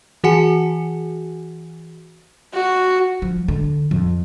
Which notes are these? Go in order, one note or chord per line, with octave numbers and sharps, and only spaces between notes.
E3 F#4 G#4 F#5 G#5 C#7
F#4
F3
D3
F2